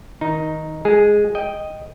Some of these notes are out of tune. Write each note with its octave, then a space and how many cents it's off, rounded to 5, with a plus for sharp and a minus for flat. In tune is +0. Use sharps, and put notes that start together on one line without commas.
D#3 +20 D#4 +0
G#3 +0 G#4 +0
D#5 +0 G5 +0